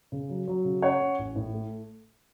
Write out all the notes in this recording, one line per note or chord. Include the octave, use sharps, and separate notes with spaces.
C#3
F#3
F#3
C#3
C#4 C#5 F#5
C#4
A1
A2
A3